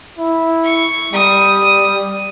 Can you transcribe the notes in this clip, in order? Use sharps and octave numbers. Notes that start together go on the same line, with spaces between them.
E4
C#6
G3 D#6